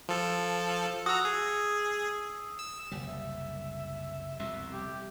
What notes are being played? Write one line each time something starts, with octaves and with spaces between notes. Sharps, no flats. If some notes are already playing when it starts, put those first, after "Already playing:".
F3 A4
F#4 A#5 D#6 E6
G#4
E6
F#1 C2 G3
E5
C2 F2 B2 E5
G4